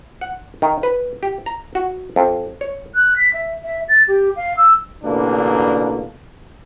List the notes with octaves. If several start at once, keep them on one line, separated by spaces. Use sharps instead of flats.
F#5
D#3
B4
G4
A#5
F#4
F2
C#5
F#6
B6
E5
E5
A6
G4
F5
E6
A1 B2 D3 A#3 D4